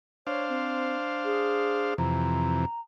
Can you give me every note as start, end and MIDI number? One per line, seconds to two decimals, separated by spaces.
0.27 1.94 62
0.27 1.94 72
0.27 0.44 73
0.27 1.94 77
0.49 0.96 60
1.25 1.95 68
1.98 2.65 41
1.98 2.65 48
1.98 2.65 52
1.98 2.80 82